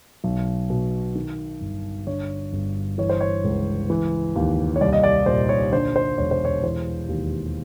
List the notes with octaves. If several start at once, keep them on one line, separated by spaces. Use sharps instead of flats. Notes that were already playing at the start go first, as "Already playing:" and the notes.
B1
B2
D#3
G1
D3 C#5
G1
E3 C#5
C5
C#5
C#2
E3
D#2
C#5
C2 D5
D#5
D5
A#2 C5
C#5
D3 C5
C5
E1 C#5
C5
C#5
E3 C5
D#2